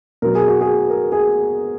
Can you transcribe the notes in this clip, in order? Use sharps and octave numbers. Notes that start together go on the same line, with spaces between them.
B2 F#3 A#4
G#4
F#4
G#4
A#4
G#4